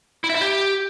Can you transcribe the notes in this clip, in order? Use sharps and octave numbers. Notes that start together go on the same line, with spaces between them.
E4
E5
E4
G4